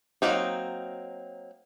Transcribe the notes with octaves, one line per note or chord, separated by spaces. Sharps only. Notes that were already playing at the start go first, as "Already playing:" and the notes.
F#3 G3 A#3 C4 D#4